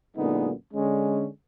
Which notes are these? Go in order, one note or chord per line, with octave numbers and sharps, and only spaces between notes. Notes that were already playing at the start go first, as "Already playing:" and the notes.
F#2 A#2 D3 G#3 B3 D#4
D3 G#3 C#4